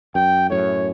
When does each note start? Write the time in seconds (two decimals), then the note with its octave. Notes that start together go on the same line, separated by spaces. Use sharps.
0.15 F#2 G5
0.50 F#2 A2 C#5